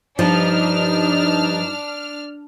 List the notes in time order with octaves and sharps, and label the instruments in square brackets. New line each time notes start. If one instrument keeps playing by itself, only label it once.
[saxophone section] G2 D#4 [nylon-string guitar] F3 [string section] D4 F6